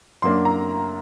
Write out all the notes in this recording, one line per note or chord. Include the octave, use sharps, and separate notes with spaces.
F#2 F#3 A#3 D4 C6
A#5